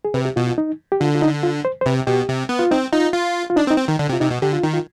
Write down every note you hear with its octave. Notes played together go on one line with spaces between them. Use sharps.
G#4
C3 B4
G4
B2 F4
F4
D#4
G4
D3 F4
F4
D#4
F4
C5
C5
C3 B4
B2 G4
C3
B3
F4
C4 D#4
D#4 F4
F4
F4
D4 D#4
C4
D#4
C4
D#3
D3 D4
C3
F4
C3 D#4
B2
D3 G4
F4
D#3 D#4
F4